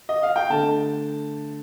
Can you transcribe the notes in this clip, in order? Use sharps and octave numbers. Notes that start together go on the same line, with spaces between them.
D#5
F5
G5
D3 A3 A5